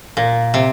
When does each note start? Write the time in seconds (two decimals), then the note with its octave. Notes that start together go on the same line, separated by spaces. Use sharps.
0.17 A#2
0.54 C3